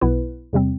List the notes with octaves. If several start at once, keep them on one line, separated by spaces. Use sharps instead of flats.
B1 B2 B3 E4 B4
E2 C3 G3 C4